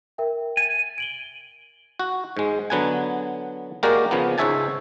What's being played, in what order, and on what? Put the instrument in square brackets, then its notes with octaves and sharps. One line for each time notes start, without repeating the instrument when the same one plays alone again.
[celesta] A#4 E5 G5
[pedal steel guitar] G#5 [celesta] A6
[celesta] D7 F#7 G7
[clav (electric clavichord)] F#4
G#2 G#3
D3 F#3 B3 F#5 G#5
G#3 A#3 F#4 G4 A#4 D5
C#3 F3 B3
C#2 G#2 C#5 E5 G#5 A5